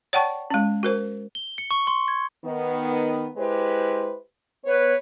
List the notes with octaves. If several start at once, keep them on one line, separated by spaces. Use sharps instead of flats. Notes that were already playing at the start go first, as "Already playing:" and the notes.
C#5 D5 F#5 G5 A5 C#6
G#3 C#4
F#4 A#4 C5
G7
C#7
C#6
C6
G#6
D#3 B3
G#3 E4 G4 B4 C5
B3 B4 C#5